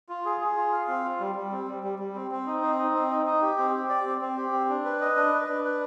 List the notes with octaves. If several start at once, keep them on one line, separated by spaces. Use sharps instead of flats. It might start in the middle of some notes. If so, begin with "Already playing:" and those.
F4
G#4
G#4
F4
F5
C4
F4
G3
G3
C4
G3
G3
G3
C4
C4
D#4
C4
D#4
C4
D#4
D#4
G4
C4
G4
D5
C4
C4
G4
C4
D4
B4
D#5
D4
B4
D4
B4